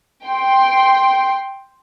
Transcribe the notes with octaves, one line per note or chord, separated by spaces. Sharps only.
G5 C6